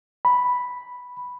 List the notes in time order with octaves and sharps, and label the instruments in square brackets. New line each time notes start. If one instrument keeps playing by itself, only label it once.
[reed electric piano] B5